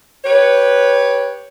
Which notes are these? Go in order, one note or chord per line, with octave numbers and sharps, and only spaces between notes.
G4 B4 C#5